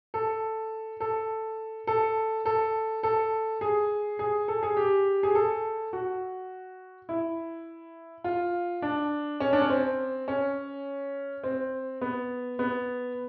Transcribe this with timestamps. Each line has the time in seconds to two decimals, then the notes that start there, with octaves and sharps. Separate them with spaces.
0.14 A4
1.00 A4
1.87 A4
2.46 A4
3.03 A4
3.61 G#4
4.19 G#4
4.48 A4
4.63 G#4
4.77 G4
5.23 G#4
5.35 A4
5.93 F#4
7.09 E4
8.24 F4
8.82 D4
9.40 C#4
9.53 D4
9.61 C#4
9.70 C4
10.28 C#4
11.44 C4
12.01 B3
12.59 B3